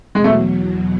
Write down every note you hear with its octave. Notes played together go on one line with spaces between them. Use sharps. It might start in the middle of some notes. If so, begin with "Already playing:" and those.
E2 B2 F#3 G#3
A3